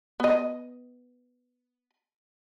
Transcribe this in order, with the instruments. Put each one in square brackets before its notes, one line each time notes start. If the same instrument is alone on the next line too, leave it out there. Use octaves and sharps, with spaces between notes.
[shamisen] B3 D#5